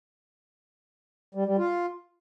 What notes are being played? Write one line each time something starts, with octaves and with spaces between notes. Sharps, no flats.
G3
G3
F4